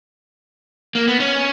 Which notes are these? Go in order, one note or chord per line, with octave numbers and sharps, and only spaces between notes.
A#3
B3
C#4